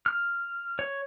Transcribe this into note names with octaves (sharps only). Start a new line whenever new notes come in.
F6
C#5